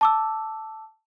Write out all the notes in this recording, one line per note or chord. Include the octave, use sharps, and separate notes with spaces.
A5 D6 E6